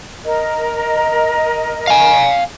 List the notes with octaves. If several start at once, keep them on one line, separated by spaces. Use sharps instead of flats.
A#4 D#5
F5 G#5